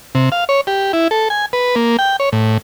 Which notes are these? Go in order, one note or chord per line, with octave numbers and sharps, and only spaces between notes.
C3
F5
C#5
G4
E4
A4
G#5
B4
A#3
G5
C#5
A2